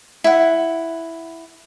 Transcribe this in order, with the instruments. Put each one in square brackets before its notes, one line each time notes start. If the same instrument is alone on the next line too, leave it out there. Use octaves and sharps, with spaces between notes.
[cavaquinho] E4 F#5